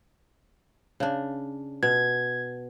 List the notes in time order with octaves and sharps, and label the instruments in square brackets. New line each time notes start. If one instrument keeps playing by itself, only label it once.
[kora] C#3 D4
[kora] B2 [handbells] G#6